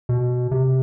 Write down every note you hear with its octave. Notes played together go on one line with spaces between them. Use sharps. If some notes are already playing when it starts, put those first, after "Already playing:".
B2
C3